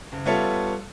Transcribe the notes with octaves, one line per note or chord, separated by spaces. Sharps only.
F#1
G3 B3 F4 A4 C#5 E5